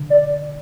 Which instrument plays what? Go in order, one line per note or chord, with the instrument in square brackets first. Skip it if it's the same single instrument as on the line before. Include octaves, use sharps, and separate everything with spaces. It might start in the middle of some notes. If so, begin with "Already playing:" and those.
Already playing: [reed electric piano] D3
[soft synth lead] D5